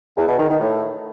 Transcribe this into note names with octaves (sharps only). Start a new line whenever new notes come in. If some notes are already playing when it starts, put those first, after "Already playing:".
E2
B2
D#3
D#3
A2